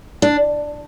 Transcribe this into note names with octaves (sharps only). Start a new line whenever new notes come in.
D4